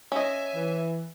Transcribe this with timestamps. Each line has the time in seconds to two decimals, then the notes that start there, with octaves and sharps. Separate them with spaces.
0.12 C#4 D#5 E5 G#5
0.56 E3